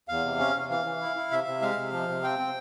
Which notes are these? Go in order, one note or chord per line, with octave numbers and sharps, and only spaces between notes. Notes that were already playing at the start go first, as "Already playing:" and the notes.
E2 F5
C3
C#4
C3
E3 F5
E3
E4
E4
C3 E5
C3
G#3 F5
C3
F3
C3
C4 G5
C4